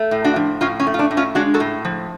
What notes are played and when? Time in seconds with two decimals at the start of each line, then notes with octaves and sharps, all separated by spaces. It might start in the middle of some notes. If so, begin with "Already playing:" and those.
Already playing: A3
0.11 A2
0.24 D4 F#4
0.36 F3
0.61 A2 C#4 F4
0.80 C#4
0.87 A3
0.94 F4
0.99 D4
1.11 A2
1.17 C#4 F4
1.35 G#3 D4 F#4
1.54 F#4 A4
1.60 A2
1.85 F3